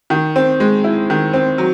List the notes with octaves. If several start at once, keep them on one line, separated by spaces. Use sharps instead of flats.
D#3
C4
G#3
E4
D#3
C4
F#3